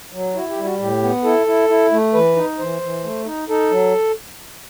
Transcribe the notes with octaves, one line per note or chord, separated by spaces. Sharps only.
F#3
E4 F#4
G4
G3
F#4
A2 G4
B3
E4 A4
E4
E4
A3
E3 B4
D#4
E3 C5
E3
A3
D#4
D#4 A4
F#3